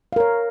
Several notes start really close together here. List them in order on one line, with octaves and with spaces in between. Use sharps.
F5 A#4 C#5